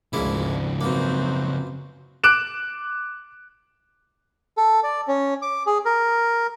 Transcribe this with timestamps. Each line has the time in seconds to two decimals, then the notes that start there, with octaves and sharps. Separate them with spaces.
0.13 G#1 D2 C#3 F3 G#3 A#3 E4
0.81 F#2 B2 A#3 C4 F#4
2.24 D6 F#6 D7 E7
4.57 A4
4.83 D5
5.08 C#4
5.42 D6
5.66 G#4
5.86 A#4